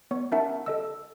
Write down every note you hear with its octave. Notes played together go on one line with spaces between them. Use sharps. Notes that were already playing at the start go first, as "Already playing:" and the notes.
B3 C#5 C#6
C#4 D#4 A#4 E5 F#5 A5
A4 D#5 E6